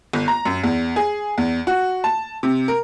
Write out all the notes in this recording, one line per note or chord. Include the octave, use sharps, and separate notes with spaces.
G1
A#5
F#2
E2
G#4
E2
F#4
A5
C3
A#4